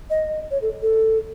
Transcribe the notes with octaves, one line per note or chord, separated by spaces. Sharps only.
D#5
C#5
A4
A4